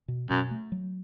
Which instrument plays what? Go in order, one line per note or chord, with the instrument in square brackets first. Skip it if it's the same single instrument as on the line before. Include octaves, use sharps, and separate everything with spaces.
[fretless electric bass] B2
[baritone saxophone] F#2 [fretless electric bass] B2
[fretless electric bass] A3
F#3